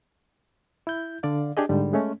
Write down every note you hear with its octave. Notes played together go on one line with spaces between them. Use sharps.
E4 G6
D3 D5 F5
D4 G4 G#4 D#5
G#2 D3 G3
G#3 A3 C#4